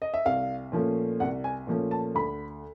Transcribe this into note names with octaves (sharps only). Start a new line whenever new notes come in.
D#5
E5
C2 F5
A#2 F3 A3 C#4
C2 F#5
G#5
A#2 F3 A3 C#4
A5
D2 B5